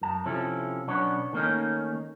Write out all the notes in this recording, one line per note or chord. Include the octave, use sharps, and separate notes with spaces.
F#2 A5
C3 F3 C#4 E4 A4
B1 B3 C#4 D4 C#5
D#3 A3 A#3 C4 C#4 D#4